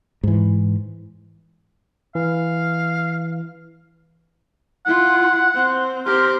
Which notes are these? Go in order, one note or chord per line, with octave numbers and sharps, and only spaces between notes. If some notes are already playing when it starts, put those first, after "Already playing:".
G#2 E3
E3 F5
E4 F4 F#5
C4
C4 G4 A#4